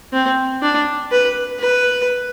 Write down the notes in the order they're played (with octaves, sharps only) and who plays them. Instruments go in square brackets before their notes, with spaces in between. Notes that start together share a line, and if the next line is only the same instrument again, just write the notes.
[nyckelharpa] C4
D4
B4
B4